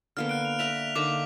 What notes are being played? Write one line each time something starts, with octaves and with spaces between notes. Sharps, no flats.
D3 A#3 B3 F6
F#6 D7
F7
D5 E5 A#5 F#6 B6 F7
D3 A#3 D#4 D6